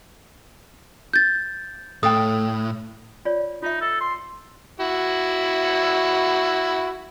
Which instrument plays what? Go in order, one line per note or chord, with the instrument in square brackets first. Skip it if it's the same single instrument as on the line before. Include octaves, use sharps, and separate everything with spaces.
[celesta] G6 A6
[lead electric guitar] A2 [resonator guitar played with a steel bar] A4 F5 G5 [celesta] D#6
[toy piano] F4 C#5 D5
[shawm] D#4 [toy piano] F4 E5
[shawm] A4
C6
[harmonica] E4 F#4